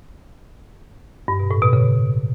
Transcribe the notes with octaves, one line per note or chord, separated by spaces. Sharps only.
G2
B2
A2
B2
C#3